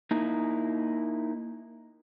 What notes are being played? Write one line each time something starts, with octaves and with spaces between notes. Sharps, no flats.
A#3 D#4 E4